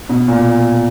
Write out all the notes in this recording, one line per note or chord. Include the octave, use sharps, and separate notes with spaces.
B2
A#2